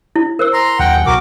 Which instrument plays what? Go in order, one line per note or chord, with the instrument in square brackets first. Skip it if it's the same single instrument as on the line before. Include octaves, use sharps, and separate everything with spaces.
[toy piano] E4
A#4 C5 E6
[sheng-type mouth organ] A#5 C6
[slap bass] D#2 F#3 [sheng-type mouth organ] F#5 G5
[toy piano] G#5
[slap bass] B1 [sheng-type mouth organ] F#4 A#4 D6